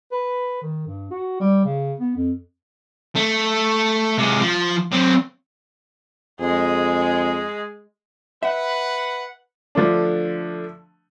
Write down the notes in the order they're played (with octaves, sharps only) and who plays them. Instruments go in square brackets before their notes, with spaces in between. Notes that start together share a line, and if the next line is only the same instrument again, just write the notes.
[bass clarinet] B4
D#3
G2
F#4
G3
C#3
B3
F2
[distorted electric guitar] A3
C3 G#3
F3
F#3 C4
[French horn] F2 [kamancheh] G#3 G#4
[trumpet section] B4 F#5 [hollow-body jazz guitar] E5
[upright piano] D3 F3 A3 D4